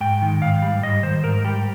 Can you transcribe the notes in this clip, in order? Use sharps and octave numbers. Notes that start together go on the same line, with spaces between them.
G#2 G5
D#3
G#2 F5
G3
G#2 D#5
D#3 C5
G#2 A#4
G3 G4